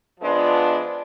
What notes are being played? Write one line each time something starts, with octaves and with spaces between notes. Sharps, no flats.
F3 G#3 B3 D4 F4